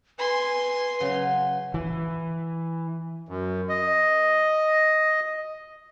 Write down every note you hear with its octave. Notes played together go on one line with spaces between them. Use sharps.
B4 G#5 C6
C#3 F#3
E3
F#2
D#5